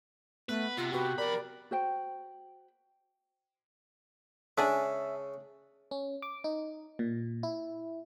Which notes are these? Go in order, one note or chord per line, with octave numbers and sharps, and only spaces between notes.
A3 B3 B4
C3 F4
F#4 G4 B4
F2 A#4 D5 B5
F#4 C5 G5
C#3 G#3 D4 G#4 E5
C#4
D6
D#4
A#2
E4